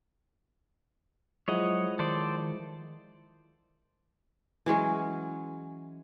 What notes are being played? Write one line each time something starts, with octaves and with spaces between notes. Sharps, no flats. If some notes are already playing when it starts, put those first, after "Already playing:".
F3 F#3 G#3 E4 C#5 D#5 F#5
D#3 A4 C5 D5
E3 F#3 G#3 C#4